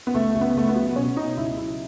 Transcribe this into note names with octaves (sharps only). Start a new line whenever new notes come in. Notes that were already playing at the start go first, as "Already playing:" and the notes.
B3
C#2 A3
C#2
B3
C#2 A3
B3
F#3
B2 C#4
B2 D#4
C#2 E4
F#3 E4